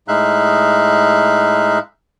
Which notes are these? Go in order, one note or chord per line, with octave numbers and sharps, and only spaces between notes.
A2 G#3 D#4 E5 F5 F#6